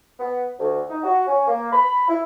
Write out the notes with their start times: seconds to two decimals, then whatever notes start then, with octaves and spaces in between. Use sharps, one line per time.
0.19 B3
0.59 D2
0.90 D#4
1.04 F#4
1.26 C#4
1.47 A#3
1.72 B5
2.08 E4